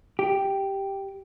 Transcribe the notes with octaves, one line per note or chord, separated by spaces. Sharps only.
G4